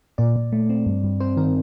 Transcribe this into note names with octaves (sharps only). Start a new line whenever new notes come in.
A#2 D5
A#2
A3
C4
G2
G2
C4 C5
D#3 A#4